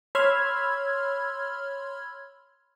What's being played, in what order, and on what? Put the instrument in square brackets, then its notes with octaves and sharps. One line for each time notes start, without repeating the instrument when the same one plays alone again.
[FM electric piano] C#5 B5 C6 E6 F6 G#6